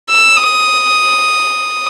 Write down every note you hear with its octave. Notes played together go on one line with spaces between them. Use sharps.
E6
D#6